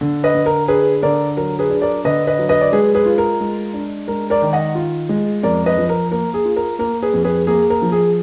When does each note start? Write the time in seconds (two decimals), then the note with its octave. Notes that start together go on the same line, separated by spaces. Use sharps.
0.01 D3
0.24 B4 D#5
0.34 D3
0.46 A#4
0.68 D4 G#4 B4
1.03 D3 A#4 D5
1.37 F#3 A#4
1.59 G#4 B4
1.70 D4
1.82 A#4 D5
2.05 D3 B4 D#5
2.27 B4 D#5
2.39 F#3
2.49 B4 D#5
2.61 D5
2.72 G#3 G#4 B4
2.95 G#4 B4
3.06 F4
3.18 A#4
3.41 G#3
3.73 D4
4.08 G#3 A#4
4.30 A#4 D5
4.42 D#3
4.53 D#5 F#5
4.75 F4
5.09 G#3
5.43 F2 A#4 D5
5.66 B4 D#5
5.77 F3
5.89 A#4
6.11 A#3 A#4
6.34 G#4
6.45 F4
6.56 A#4
6.79 A#3 A#4
7.03 G#4 B4
7.13 F2
7.24 G#4 B4
7.47 A#3 G#4
7.70 A#4
7.82 F3
7.92 G#4